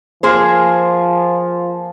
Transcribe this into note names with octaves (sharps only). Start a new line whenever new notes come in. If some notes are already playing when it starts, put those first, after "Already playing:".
F3 A#3 G#4 C5